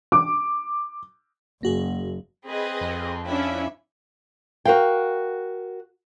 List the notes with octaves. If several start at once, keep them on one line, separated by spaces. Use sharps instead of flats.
D6
F#1 A#3 F#4 G#4
C4 G#4 B4 D#5
F2
C#4 D4 E4 E5 B5
F#4 A#4 F5 G5